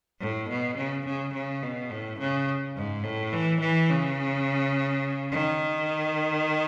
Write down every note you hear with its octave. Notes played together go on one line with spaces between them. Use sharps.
A2
B2
C#3
C#3
C#3
B2
A2
C#3
G#2
A2
E3
E3
C#3
D#3